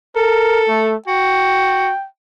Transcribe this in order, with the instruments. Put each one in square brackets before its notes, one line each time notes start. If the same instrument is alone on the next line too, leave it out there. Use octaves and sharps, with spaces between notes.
[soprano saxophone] A4 [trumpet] A#4
[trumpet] A3
[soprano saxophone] F#4 [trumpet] G5